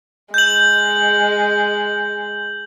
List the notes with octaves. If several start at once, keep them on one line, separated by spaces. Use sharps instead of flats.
G#3 G6 F#7